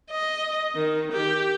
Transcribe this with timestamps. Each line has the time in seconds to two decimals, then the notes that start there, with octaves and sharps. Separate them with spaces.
0.11 D#5
0.76 D#3
1.13 G4